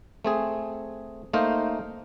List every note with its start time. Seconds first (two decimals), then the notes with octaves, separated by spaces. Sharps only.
0.25 A3 C4 G#4
1.33 A3 A#3 D#4 A#4 C5